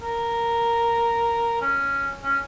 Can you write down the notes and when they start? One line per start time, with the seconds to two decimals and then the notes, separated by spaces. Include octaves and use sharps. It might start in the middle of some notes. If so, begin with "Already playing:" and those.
0.02 A#4
1.61 C#4
2.24 C#4